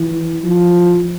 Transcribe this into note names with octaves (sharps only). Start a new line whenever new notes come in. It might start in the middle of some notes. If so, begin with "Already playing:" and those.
Already playing: E3
F3